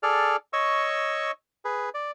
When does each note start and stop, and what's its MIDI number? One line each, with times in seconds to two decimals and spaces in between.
0.03 0.36 68
0.03 0.36 69
0.03 0.36 74
0.03 0.36 89
0.53 1.31 73
0.53 1.31 75
0.53 1.31 85
0.53 1.31 88
1.65 1.89 68
1.65 1.89 71
1.94 2.11 74